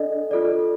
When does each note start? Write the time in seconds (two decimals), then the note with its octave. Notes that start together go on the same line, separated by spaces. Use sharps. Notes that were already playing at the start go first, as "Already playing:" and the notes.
Already playing: D4 A4 D5 D#5
0.31 F4 A4 D5